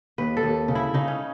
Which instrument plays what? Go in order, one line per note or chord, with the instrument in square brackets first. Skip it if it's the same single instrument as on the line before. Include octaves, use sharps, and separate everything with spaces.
[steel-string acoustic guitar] D#2 [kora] B4
[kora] A4
[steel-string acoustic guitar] D#2
C#3
[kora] E4
[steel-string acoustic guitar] C#3 [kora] D#4
[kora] C#4